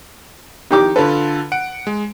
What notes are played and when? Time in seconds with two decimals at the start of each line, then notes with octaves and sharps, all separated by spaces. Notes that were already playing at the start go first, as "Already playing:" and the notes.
0.71 D#3 G4 D6
0.96 D3 F4 A4 B4
1.52 F#5 D7
1.87 G#3